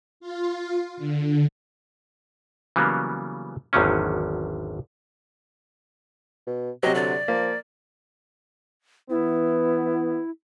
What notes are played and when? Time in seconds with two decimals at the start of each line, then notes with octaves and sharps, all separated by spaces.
0.20 F4
0.97 D3
2.76 C#3 E3 F#3 G3 A#3 B3
3.73 G#1 E2 D3 D#3 F#3 C#4
6.47 B2
6.83 C3 F#3 G4 D#5
6.95 D3 D5
7.28 F3 A#3
9.10 E3 B3 E4